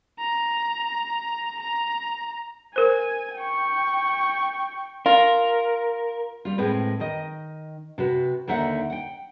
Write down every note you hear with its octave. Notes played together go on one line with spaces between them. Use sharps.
A#5
A#5
A#4 C5 G#5
G5 C#6
F4 A#4
G3 F4
A2 G#3 C4 B4
D#3 D#5
C3 F#4 B4
D#2 D3 D#4 E5 F#5
F#5 G5